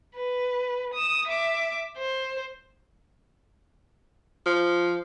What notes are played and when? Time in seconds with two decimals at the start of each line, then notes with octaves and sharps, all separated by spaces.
0.15 B4
0.94 D#6 E7
1.28 E5 D6
1.98 C5
4.46 F3